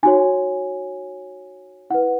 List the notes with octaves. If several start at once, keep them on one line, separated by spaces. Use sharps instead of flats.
D#4 F#4 C#5 G#5
E4 B4 F#5